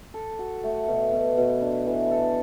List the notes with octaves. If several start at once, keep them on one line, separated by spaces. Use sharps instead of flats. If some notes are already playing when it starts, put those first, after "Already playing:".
A4
F#4
A3
B2
B2
B2
D4
E3
A4